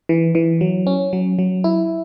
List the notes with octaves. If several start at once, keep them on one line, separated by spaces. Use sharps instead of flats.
E3
E3
F#3
C#4
F#3
F#3
E4